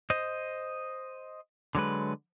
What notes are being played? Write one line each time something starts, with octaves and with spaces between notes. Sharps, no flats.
C5 D#5
D3 F#3 G#3 B4